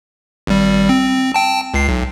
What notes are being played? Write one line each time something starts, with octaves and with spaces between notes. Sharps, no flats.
G#1 G3
C4
G5 A5
C#2 C7
B1